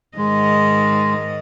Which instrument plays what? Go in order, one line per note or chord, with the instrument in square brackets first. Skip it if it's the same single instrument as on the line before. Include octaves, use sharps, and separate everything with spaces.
[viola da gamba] G#2 D#3 D#5 [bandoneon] G#3